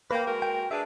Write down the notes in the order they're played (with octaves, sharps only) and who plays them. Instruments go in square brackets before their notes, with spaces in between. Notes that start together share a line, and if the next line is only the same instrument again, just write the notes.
[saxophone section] A#3 [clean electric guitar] B4 G5
[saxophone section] G#3 F#4 A#4
[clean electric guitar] G5
[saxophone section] D4 G#4 B4 [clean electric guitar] E5